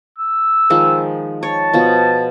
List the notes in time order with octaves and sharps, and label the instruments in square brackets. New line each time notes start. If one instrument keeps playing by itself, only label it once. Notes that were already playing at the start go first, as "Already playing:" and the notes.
[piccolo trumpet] E6
[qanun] D#3 F3 G#3
[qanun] C#5 [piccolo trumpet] A5
[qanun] B2 F3 B3